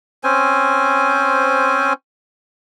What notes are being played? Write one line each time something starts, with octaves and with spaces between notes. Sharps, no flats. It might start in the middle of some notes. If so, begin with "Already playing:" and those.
C4 C#4 C5 G#5